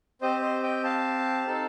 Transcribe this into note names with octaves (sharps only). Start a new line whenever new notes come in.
C4 G4 C5 D#5
C5 D#5
D#5 G5
F5 A5
C4 D#4 A4